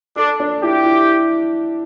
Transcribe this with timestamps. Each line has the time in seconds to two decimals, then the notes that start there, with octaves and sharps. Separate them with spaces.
0.16 D4 A4
0.40 D4
0.63 E4 G4
0.85 E4